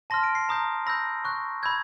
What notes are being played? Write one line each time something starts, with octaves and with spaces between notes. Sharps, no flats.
A5 C6 F6 A#6
D7
C7
A#5 D#6 G6
B5 E6 G6 A#6
C#6 F#6
B5 E6 G6 G#6